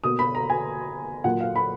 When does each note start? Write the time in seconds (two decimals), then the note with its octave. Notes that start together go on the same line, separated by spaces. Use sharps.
0.04 B2 A#3 D#6
0.19 B5
0.35 A#5
0.50 G#5
1.24 A#2 F#3 A#3 F#5
1.41 F5
1.56 B5